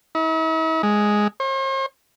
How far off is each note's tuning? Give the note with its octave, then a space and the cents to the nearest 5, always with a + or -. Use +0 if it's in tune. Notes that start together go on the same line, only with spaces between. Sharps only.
E4 -45
G#3 +5
C5 +45